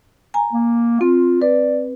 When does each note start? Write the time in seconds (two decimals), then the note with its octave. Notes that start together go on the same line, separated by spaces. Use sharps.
0.34 G#5 A#5
0.53 A#3
1.01 C4 F4
1.42 B4 D5